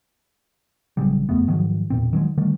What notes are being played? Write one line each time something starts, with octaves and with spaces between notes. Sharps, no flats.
A1 C#3 F#3 G3
F#1 F2 A3 B3
G#2 D#3 F3 F#3
E1 A#2 C4
D#3 F#3 G#3
D3 D#3 G3 A3